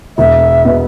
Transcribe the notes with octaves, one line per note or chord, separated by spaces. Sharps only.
E1 E5
B2 B3